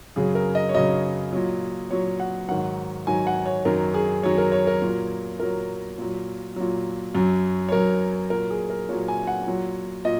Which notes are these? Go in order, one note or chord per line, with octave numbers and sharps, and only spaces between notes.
F#2 C#3 F#3 G#4
A#4
D#5
C#5
F#2 C#3 F#3 D#5
A#2 F#3
A#2 F#3 C#5
F#5
G#2 D#3 F#3 F#5
G#2 D#3 F#3 G#5
F#5
C#5
F#2 D#3 F#3 A#4
G#4
F#2 D#3 F#3 C#5
A#4
C#5
A#4
A#2 F#3
A#2 F#3 A#4
A#2 F#3
A#2 F#3
F#2 F#3
C#5
F#2 F#3 A#4
A#2 F#3 A#4
G#4
A#4
A#2 F#3 C#5
G#5
F#5
A#2 F#3
A#2 D#5